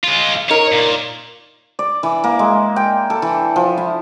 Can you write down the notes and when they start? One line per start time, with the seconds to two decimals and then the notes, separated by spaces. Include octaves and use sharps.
0.04 G#3 F4
0.50 D#4 A#4 C#5
0.73 A#2
1.79 D5
2.03 E3
2.24 A#3
2.39 G#3
2.76 G5
3.10 A4
3.22 E3
3.56 F3
3.78 E4